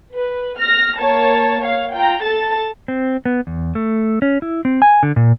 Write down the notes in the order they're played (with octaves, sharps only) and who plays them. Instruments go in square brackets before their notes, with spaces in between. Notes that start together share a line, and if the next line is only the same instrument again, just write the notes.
[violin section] B4
F6 A#6
A#3 C#5 A5
C#5 F5
F4 G5 A#5
A4 A5 A6
[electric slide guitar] C4
B3
E2
A3
C#4
E4
C4
G#5
D3
A#2